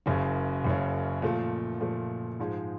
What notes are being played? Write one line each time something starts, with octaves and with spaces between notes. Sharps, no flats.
F#1 F#2 C#3
F#1 F#2 C#3
A#2 F3 A3
A#2 F3 A3
G#2 F3 G#3